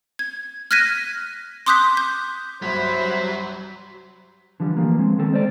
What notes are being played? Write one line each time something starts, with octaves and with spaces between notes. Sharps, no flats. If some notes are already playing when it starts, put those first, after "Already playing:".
G#6
F6 F#6 G#6 A#6 B6 D#7
C6 D6 D#6 F#6 G6 B6
G6
C2 G2 F#3 C5 B5
D3 E3 F3 G3
E3 F3 A#3
G#3 C4
D#3 C4 A4
G#3 C5 D5